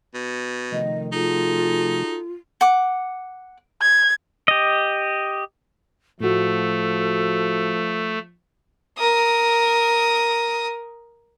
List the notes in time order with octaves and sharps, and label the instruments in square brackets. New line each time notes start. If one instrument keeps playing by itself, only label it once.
[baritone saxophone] B2
[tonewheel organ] C3 F3 A3 [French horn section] D#3 [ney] D#5
[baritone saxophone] D#4 [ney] F4 [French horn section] F#4 G#4 A4
[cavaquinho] F#5 D6
[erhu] G#6
[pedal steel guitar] G4 D#5
[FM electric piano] A2 F#4 [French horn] F3 [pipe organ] A3 [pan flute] A4
[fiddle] A#4 D#6